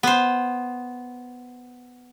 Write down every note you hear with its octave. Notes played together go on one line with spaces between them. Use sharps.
B3 C5